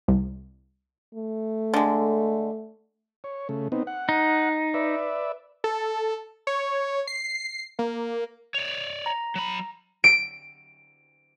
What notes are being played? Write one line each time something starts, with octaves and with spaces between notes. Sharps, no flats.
C2
A3
D3 G#3
C#5
C#3 A3
B3 C4 D#4
F#5
D#4
B4 D5 E5
A4
C#5
C7
A#3
C#5 D5
A#5
F#3 B5
D7